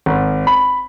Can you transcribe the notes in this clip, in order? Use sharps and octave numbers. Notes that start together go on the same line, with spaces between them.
G#1
B5